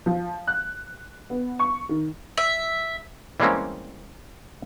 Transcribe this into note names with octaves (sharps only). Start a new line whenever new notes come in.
F3
F#6
B3
C#6
D#3
E5
E3 G3 G#3 A#3 C4 C#4